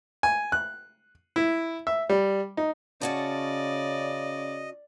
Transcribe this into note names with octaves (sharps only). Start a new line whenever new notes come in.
G#5
F#6
E4
E5
G3
D#4
C#3 C#4 F#4 D5 D#5 A5